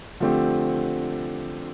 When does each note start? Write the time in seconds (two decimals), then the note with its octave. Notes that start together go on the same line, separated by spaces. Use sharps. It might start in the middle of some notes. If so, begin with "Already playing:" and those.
0.20 D3 F3 A3 C4 G4